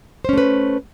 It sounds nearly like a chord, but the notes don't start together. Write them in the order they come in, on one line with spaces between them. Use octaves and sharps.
C5 C#4 A3 B4